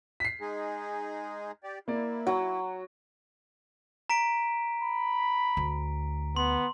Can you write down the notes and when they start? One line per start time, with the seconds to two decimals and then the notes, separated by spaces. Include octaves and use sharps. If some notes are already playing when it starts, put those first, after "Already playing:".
0.20 B6 C7
0.41 G#3 D#4 G#4
1.64 G4 D5
1.88 A#3 E4 D5
2.27 F#3 F#5
4.10 A#5 B6 D7
4.84 B5
5.57 D2
6.36 B3 C6